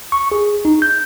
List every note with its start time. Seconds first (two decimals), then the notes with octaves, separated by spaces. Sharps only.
0.12 C#6
0.32 G#4
0.65 D#4
0.82 G6